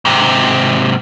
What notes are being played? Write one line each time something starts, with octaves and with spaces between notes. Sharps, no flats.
G#2 C3